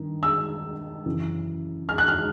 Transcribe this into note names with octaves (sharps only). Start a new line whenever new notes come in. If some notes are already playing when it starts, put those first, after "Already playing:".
Already playing: G2 D#3
E6
F#2 C#3 E3
F6
F#6
F6